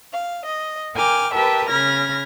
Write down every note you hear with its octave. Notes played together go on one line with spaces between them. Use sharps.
F5
D#5
A#4 G5 G#5 D6 F6
G4 A#4 B4 E5 G5 A5
C#3 B5 F6 G#6 A#6